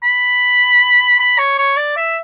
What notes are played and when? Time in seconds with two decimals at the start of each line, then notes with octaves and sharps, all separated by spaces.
0.03 B5
1.19 B5
1.38 C#5
1.58 C#5
1.76 D5
1.97 E5